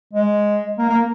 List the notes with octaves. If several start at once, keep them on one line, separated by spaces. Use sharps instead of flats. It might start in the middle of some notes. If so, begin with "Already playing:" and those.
G#3
A#3
A#3